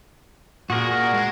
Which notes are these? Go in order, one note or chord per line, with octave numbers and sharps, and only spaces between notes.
A#2 F#4 G#4 A#4
G#3